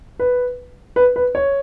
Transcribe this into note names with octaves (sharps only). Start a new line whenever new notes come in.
B4
B4
B4
C#5